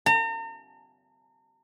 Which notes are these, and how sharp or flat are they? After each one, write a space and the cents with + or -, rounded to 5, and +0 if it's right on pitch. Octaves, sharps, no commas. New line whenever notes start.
A#5 -40